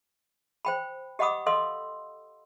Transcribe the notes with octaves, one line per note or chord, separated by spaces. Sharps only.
C5 G5 B5
G4 D#5 F#5 B5 D6 D#6
A4 D#5 F5 C6 E6